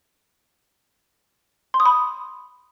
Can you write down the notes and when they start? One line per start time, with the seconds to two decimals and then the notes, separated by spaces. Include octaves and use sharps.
1.74 C6
1.80 D#6
1.86 B5